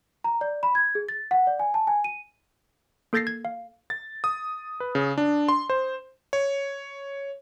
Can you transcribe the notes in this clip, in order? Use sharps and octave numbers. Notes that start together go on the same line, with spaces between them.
A#5
D5
B5
G#6
G#4
A6
F#5
D5
G#5
A5
G#5
D#7
A#3 A4 G6 A6 A#6 C7
G#6
F5
A6
D#6
B4
C#3
D4
C6
C5
C#5